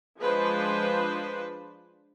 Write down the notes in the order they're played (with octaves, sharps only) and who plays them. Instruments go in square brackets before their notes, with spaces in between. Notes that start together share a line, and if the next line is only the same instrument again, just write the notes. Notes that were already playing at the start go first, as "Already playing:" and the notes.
[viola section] F3 G#3 D4 B4 C5